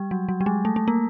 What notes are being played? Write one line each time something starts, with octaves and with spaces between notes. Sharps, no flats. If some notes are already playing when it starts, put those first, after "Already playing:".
Already playing: G3
F#3
F#3
G3
G#3
A3
A3
A#3